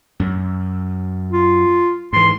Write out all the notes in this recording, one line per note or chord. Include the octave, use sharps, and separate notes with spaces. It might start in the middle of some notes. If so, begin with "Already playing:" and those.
F#2
F4
G#2 E3 C6